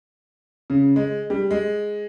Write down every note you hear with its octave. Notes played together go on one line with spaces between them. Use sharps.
C#3
G#3
G3
G#3